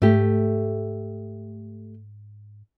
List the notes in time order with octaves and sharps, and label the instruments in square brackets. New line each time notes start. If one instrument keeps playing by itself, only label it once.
[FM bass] G#2 [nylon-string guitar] A3 G4